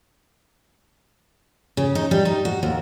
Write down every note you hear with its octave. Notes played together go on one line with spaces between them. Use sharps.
C#3
D#4
G3
D#4
F#4
D#2